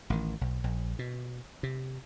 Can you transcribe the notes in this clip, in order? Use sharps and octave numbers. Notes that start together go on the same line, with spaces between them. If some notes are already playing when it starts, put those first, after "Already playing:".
A1 D#3
B1
A#1
B2
C3